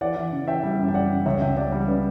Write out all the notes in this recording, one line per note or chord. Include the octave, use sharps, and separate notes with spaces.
E3 D5 F#5
E3
C#3
E3 E5 G5
G3
F#2
G5
G3 D5 F#5
C#3
C#2 C#5 E5
C#2 E5 G5
G3 D5 F#5
G3
C#3 B4 D5